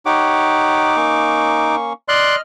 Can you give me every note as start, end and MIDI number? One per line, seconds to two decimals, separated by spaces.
0.06 1.76 63
0.06 0.96 67
0.06 0.96 73
0.06 0.96 78
0.06 1.76 86
0.97 1.93 58
0.97 1.93 61
0.97 1.93 85
2.08 2.36 74
2.08 2.41 75
2.08 2.36 84
2.08 2.41 89
2.08 2.36 90